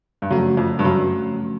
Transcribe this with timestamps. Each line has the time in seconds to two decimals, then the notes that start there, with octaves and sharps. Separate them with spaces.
0.22 G2
0.30 F#2 C#3 F3 A3 C#4 F#4
0.57 F2
0.79 G2
0.85 F#2